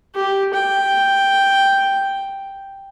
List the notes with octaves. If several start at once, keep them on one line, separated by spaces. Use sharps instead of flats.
G4
G5